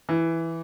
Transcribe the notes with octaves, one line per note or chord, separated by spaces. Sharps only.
E3